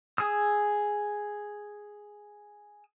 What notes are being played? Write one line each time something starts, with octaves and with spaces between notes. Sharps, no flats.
G#4 D#6 E6